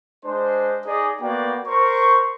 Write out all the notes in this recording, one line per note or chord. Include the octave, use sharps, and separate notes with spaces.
G#3 D4 C5
D#4 G#4 D5 D#5
A#3 B3 F#4 D5 G5
A#4 C5 C#6